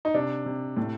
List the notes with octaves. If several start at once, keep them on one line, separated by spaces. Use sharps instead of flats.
D#4
C3 D4
C3
A2